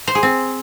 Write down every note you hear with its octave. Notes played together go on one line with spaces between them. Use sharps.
C5
G#4
C4